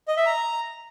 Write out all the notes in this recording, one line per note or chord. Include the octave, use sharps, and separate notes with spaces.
D#5
E5
A#5